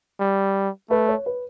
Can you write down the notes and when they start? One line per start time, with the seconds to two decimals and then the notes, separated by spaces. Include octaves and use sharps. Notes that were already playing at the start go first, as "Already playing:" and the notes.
0.20 G3
0.90 A3 B4
1.09 C#5
1.26 B4